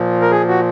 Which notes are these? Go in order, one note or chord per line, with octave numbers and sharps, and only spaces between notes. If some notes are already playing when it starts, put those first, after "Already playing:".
Already playing: A#2 F3
A#4
G#4
F#4